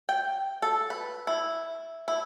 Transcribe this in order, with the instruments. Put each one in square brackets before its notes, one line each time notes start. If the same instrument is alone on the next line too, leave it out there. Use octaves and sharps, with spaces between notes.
[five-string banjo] G5
A4
B4
E4
E4